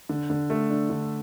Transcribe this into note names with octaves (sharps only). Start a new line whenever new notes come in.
D3
D3
A3
D4
D3